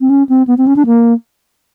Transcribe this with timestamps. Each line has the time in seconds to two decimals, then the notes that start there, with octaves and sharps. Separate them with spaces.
0.01 C4
0.10 C#4
0.29 C4
0.47 B3
0.58 C4
0.67 C#4
0.76 D4
0.86 A#3